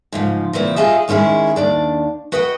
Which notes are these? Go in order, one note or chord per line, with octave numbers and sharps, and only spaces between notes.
G#2 C#3 F3
A#2 C#3 E3 C4
F4 G4 G#4 D#5 E5
D#3 G#3 C#4 E4 G#4
D#2 D4 D5
F#4 B4 D#5 F#5 G5